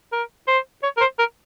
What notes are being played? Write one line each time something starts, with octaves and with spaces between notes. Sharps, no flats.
A#4
C5
C#5
A#4
C5
A#4